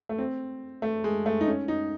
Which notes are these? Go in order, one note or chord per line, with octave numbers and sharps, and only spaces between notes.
A3
C4
A3
G#3
A3
D#4
C#4
D#4